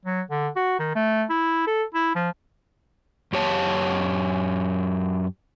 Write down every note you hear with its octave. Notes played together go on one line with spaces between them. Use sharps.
F#3
D3
F#4
D#3
A3
E4
A4
E4
F3
F#2 G4 C#5 A5